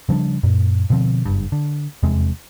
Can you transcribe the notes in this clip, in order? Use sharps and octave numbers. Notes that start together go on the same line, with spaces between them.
C#3 F3 G3 D4
F#2 A#2
B2 D3 F3 C4
F#1 G2
D3
F1 E2 C3 G#3